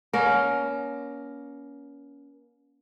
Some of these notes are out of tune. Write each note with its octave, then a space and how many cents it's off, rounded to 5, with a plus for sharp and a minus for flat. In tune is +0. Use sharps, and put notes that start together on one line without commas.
A#3 +40 C#4 +25 A#4 +0